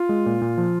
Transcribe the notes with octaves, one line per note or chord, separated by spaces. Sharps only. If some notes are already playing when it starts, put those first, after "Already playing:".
Already playing: F4
G#3
A#2
A#2
F3